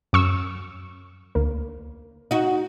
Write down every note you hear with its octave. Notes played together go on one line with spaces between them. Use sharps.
F#2 C#6 E6
D2 A#3
D#4 F#4